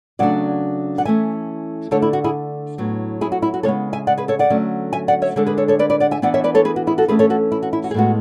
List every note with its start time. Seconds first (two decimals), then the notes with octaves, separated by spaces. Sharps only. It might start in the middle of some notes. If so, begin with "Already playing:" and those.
0.19 C#3 F#3 A3 D4 D5 F#5
0.98 F#5
1.05 E3 A3 C#4 E5 G#5
1.91 D3 A3 D4 A4 C#5
2.02 E4
2.13 F#4
2.24 E4 G#4
2.78 A2 F#3 B3
3.21 E4 G#4
3.32 F#4
3.42 E4
3.54 F#4
3.63 C#3 G#3 B3 A4 C#5
3.93 E5 G#5
4.07 D5 F#5
4.18 G#4 B4
4.28 A4 C#5
4.39 D5 F#5
4.50 D3 F#3 A3 C#4
4.93 E5 G#5
5.08 D5 F#5
5.22 C#5 E5
5.36 D3 G#3 D4 A4 C#5
5.46 G#4 B4
5.57 A4 C#5
5.68 A4 C#5
5.79 B4 D5
5.90 B4 D5
6.00 D5 F#5
6.11 E5 G#5
6.22 E3 B3 D4 D5 F#5
6.34 C#5 E5
6.44 B4 D5
6.55 A4 C#5
6.65 G#4 B4
6.76 F#4
6.87 E4 G#4
6.98 F#4 A4
7.08 E3 A3 C#4 G#4 B4
7.19 A4 C#5
7.30 F#4 A4
7.52 E4
7.62 F#4
7.73 E4
7.84 F#4
7.91 G#4
7.94 A2 G#3 B3 F#4